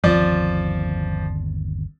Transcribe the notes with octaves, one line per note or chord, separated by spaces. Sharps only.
G1 D#2 F3 C4 D5